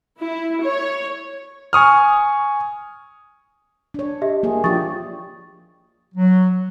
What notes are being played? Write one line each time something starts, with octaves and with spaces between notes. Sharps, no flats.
E4
C#5
G#5 C#6 D#6 F6
D4 C#5
G4 D#5 E5
A#3 G#4
F3 D4 G4 C#6 D#6 A6
F#3